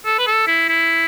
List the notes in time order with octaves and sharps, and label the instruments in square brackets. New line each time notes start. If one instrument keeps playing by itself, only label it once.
[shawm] A4
B4
A4
E4
E4